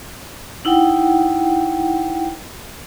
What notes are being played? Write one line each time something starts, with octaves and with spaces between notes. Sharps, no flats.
D#4 E4 F#5 G5